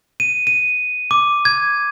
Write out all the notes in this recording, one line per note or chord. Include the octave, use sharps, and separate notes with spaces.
D#7
D#7
D6
G#6